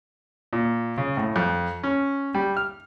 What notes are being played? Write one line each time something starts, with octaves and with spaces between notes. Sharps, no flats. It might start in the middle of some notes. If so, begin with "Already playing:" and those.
A#2
C#3
A2
F2
C#4
G3
F6